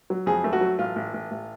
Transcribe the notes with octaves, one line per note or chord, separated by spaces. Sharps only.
F#3
F2 G#4
A3
F#4
F#3
A1 F4
A1
A1
A1